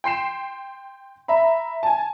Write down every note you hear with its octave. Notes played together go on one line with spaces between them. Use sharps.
G5 C6 C7 E7
E5 A#5 B5
G#5 A5